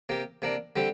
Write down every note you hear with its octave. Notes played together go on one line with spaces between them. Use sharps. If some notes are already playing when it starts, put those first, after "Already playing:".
C3 A#3 G4
C3 A#3 D4
D3 G3 C4 G4